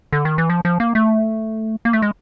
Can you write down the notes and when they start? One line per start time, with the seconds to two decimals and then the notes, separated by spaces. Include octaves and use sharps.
0.13 D3
0.25 D#3
0.38 E3
0.50 F3
0.65 F3
0.80 A#3
0.95 A3
1.85 A#3
1.93 A3
2.02 G#3